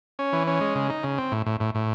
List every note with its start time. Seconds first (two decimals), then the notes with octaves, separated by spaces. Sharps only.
0.19 C#4
0.33 E3
0.47 C#4
0.61 G#3
0.75 C#3
0.90 D#4
1.03 C#3
1.18 C4
1.32 A2
1.46 A2
1.60 A2
1.75 A2